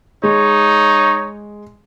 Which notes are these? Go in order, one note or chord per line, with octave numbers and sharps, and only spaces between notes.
G#3 D#4 C#5